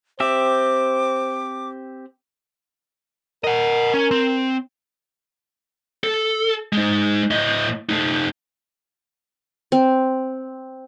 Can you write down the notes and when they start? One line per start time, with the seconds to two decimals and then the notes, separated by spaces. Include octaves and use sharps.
0.20 C4 G4 C5 E5 D6
3.44 A#4 D#5 F#5
3.94 C#4
4.11 C4
6.04 A4
6.73 G#3 D#4
7.31 A2 D#5
7.89 A3 D#4
9.72 C4